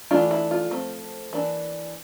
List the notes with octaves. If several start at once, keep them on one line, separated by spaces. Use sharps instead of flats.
E3 A3 D4 F4
E4
F4
F3 A3 C4
E3 A#3 D4